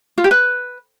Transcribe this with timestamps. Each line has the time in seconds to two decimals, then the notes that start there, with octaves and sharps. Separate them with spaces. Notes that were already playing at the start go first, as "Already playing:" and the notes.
0.18 F4
0.24 G4
0.31 B4